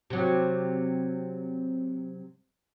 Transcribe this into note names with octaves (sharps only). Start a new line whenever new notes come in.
C3 F#3